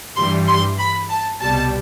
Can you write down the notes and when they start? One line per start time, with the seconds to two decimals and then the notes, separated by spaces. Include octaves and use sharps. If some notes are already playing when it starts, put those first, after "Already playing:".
0.17 G2 E3 G3 C6
0.47 C6
0.79 B5
1.10 A5
1.40 C2 B2 G3 A5